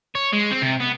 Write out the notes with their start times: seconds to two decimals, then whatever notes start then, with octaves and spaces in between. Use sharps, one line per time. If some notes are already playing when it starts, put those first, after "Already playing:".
0.15 C#5
0.33 G#3
0.51 C4
0.62 C3
0.80 B3